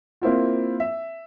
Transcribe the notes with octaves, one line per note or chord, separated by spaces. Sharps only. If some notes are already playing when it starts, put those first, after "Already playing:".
A#3 C4 E4 F4
E5